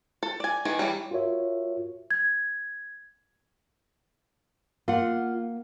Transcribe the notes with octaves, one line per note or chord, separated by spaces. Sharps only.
A4
D5 G#5
D#3 E3 G#4
E3 F#3 G3
F4 F#4 A#4 C#5 E5
G#6
A#3 F4 F#5